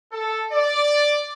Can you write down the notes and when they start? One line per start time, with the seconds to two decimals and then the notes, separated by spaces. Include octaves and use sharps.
0.11 A4
0.51 D5